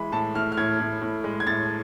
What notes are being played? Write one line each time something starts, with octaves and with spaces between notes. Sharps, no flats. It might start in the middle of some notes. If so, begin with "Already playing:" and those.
Already playing: E3 G#3 B5
A2 A5
A2 F6
F6
A2 G#6
A2
A2
G#3
G#6
A2 A6